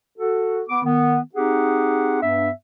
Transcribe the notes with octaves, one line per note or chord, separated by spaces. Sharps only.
F#4 A4
B3 D6
D#3 B3
C4 D#4 G4 G#4 F#5
G2 B3 D4 E5